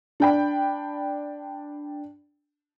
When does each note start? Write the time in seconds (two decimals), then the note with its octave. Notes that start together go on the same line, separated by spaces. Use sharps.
0.20 D4 G5 B5